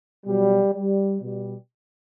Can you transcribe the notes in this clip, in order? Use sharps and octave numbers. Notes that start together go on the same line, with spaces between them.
B2 F#3 G3
G3
B2 G3